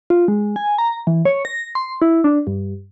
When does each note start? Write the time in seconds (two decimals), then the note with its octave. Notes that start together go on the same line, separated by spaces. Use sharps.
0.10 F4
0.28 G#3
0.56 G#5
0.78 A#5
1.07 E3
1.25 C#5
1.45 A#6
1.75 C6
2.02 E4
2.24 D4
2.47 G2